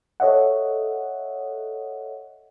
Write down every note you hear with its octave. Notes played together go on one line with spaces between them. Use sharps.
A4 C#5 D#5 E5 F#5